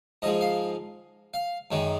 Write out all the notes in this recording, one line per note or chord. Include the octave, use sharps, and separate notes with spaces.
G#2 F3 G#3 D#5
F5
F5
F#2 D#3 G#3